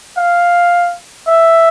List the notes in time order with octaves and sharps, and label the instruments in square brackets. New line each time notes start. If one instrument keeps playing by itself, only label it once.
[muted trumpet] F5
E5